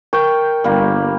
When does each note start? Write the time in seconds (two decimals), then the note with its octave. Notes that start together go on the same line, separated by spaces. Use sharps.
0.13 A#4 G5 C#6 G6
0.64 G1 G3 A#3